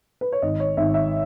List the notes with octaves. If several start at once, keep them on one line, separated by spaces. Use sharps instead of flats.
B4
C#5
G#1 D#5
C#5
G#1 E5
E5